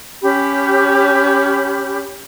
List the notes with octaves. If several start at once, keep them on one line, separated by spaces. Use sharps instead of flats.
C#4 G4 B5